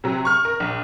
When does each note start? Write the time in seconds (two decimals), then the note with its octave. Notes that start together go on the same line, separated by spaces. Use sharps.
0.04 C3 F#3
0.25 C#6 F6
0.45 A#4
0.60 A#1